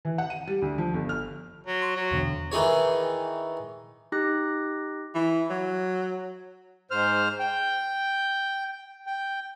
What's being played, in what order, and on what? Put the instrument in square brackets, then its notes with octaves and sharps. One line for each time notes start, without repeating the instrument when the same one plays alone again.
[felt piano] E3
F#5
D#7
G3
D2
F3
G1
F6
[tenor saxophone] F#3
[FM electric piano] C6 C#6
[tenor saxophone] F#3
[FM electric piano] E2 B2 D3
[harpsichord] D#3 E3 D#4 G#4 C#5
[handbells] D#4 G4 F#6 A#6
[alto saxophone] E3
F#3
[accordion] G#2 C5 F6
G5
G5